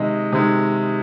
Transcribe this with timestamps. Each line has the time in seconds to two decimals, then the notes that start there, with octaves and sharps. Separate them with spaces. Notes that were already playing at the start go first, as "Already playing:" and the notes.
Already playing: C3 D#3 G#3 D#5
0.32 C3 D#3 G#3